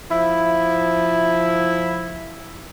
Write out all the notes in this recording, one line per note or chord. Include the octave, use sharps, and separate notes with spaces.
F3 E4